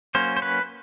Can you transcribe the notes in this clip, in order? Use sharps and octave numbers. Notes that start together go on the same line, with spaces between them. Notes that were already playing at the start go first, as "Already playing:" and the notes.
F#3 A#3 C#4 C5
C5
B4